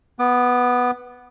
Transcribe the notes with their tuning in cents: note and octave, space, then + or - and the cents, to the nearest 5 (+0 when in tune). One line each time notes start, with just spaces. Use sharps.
B3 +0 D6 +35